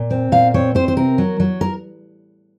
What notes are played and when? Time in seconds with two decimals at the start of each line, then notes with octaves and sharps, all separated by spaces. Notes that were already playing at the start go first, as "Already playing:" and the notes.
Already playing: A#2
0.11 C4
0.32 A#2 F5
0.54 C4 C#5
0.75 C4 C5
0.88 C5
0.97 C3 A#4
1.18 F#3
1.40 F#3
1.61 A#4